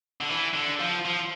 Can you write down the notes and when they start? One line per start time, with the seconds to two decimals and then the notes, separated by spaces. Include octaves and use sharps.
0.21 D3
0.29 E3
0.54 D3
0.80 F3
1.05 F3